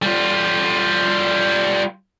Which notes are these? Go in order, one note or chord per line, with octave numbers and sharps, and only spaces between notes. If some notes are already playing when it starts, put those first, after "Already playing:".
G3 F4